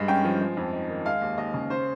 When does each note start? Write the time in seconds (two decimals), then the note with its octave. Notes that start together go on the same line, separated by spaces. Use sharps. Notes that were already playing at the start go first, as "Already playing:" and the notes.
Already playing: G2 G#3
0.08 C#4 G5
0.24 F3
0.41 G#3
0.57 F2
0.73 D#4
0.89 D#3
1.05 G#3 F5
1.21 D#2
1.38 D#2 D#5
1.54 C#3
1.70 C#4 C5